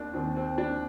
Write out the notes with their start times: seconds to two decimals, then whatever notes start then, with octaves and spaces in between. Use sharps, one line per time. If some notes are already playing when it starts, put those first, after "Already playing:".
Already playing: D#2 D#3 D4
0.14 D#2 D#3 C4
0.37 C4
0.58 D4